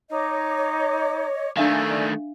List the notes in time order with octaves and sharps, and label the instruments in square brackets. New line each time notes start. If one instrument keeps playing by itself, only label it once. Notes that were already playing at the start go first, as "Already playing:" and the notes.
[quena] D#4 [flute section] C#5 D#5 D6
[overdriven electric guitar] D#3 A3 [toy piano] D4 E5 F5 [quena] A4 [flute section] D5 G#5